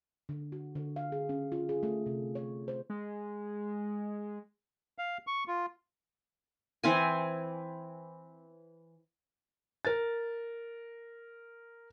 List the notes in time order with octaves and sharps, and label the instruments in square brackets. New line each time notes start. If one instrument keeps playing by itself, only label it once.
[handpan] D3
F#4
D3
F5
G#4
C#4
F4
G#4
A3
C3
C#5
C5
[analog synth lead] G#3
[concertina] F5
C#6
F4
[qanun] E3 C4 G#5
[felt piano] A#4 A6